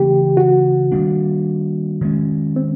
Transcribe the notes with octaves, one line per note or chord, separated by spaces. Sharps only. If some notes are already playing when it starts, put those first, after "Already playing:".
Already playing: C#3 E3 A3 C4 G4
F#4
D#3 G3 A#3 D4
D#3 G#3 C#4
C4